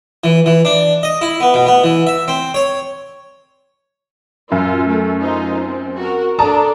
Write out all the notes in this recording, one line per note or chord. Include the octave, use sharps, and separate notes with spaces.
E3
E3
D4
D#5
E4
B3
B2
B3
E3
E5
C4
C#5
F#2 F4
A3
D#4 F4 C5
C4
F#4 A#4
D4 A4 D5 A5 A#5 D#6